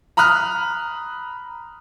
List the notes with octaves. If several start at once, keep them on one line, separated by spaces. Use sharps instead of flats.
A#5 B5 D#6 F6 F#6